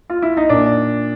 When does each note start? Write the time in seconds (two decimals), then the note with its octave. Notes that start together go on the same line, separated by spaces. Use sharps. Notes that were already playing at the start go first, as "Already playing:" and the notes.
0.09 F4
0.22 E4
0.37 D#4
0.49 A#2 D4